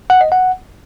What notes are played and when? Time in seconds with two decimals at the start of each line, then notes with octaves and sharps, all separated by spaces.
0.10 F#5
0.21 D#5
0.32 F#5